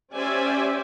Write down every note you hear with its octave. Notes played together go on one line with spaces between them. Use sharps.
C#4 G4 C5 D5 E5 G#5